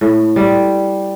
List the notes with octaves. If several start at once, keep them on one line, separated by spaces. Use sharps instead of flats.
A2
G3